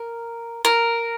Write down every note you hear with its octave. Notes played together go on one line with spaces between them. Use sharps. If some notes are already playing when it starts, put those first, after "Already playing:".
Already playing: A#4
A#4